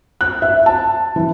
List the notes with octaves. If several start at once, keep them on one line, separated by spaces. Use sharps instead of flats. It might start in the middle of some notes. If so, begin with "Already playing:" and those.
F#6
E5
A5
E3